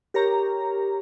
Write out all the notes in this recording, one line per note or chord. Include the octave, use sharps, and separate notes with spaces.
G4 A#4 C#5 A#5